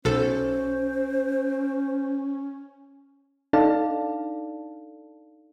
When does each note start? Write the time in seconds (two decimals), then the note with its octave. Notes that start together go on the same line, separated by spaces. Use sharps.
0.05 B1 C#4 A4 C5
3.53 D4 D#4 A4 D5 F5 A5